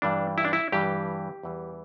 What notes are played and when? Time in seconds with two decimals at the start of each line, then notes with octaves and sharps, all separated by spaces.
0.02 G2 E3 G3 D4
0.38 E4
0.45 D4
0.53 E4
0.72 G2 E3 G3 G4
1.43 E2 E3 G3